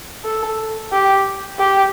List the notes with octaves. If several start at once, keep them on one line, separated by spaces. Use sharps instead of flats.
A4
G4
G4